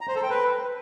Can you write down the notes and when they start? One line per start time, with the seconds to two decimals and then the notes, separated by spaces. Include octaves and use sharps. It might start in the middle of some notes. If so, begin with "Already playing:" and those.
0.01 A#5
0.08 C5
0.16 A4
0.23 G5
0.30 B4